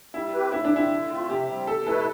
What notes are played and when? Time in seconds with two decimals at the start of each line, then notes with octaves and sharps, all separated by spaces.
0.14 G3 E4
0.33 C4 G4 B4
0.52 A2 E4
0.65 D4
0.72 F3 C4 E4
0.91 D3
1.10 A3 C4 F4
1.29 C3 G4
1.48 G3 C4
1.67 E2 A4
1.86 B2 A3 E4 A4 B4